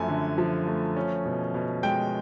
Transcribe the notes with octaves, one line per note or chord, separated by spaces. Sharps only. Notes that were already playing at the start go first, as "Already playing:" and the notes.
Already playing: F#2 F3 A3 G#5
D3
F3
A3
C#4
B2
B2
G#3 G5